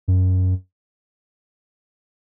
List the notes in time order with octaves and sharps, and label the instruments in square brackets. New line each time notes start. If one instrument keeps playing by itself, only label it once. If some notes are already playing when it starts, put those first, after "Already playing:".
[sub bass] F#2